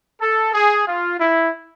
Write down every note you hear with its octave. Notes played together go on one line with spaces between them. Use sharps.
A4
G#4
F4
E4